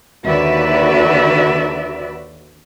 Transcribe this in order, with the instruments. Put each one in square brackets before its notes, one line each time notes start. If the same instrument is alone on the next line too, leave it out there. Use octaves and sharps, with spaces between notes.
[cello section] D#2 D3 F#4 B4 D5 E5